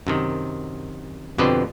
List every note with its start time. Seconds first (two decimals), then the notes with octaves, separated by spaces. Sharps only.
0.07 F#2 C3 D#3
1.38 F2 B2 D3 G4 B4 C5